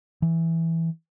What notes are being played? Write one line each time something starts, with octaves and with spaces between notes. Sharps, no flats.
E3